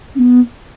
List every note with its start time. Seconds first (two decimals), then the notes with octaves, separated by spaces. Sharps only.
0.15 C#4
0.19 B3